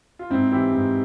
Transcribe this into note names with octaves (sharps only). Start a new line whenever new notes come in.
F4
G#2 C4 E4
E3 E4 G4
G#2